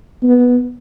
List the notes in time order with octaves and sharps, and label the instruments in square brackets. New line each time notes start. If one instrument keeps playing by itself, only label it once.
[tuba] B3